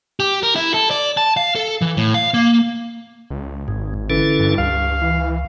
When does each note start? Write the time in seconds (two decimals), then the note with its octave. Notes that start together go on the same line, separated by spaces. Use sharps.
0.20 G4
0.43 A#4
0.56 E4
0.74 A4
0.91 D5
1.17 A5
1.37 F5
1.55 A4
1.82 E3
1.97 A2
2.14 F5
2.34 A#3
3.30 C#2
3.68 G#1 G#2
4.10 D3 E3 C#4 A4
4.39 G2
4.58 C#2 F5
5.02 E3